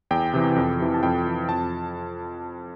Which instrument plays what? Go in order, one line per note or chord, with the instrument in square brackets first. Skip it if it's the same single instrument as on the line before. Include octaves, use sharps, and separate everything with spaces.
[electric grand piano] E2 G5
C3 E3
F2
C3 E3
A5
F2 G5
E3
F2 A5